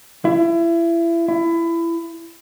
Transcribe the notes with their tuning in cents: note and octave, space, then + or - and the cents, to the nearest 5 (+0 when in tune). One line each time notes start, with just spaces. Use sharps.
E4 +30
E4 +25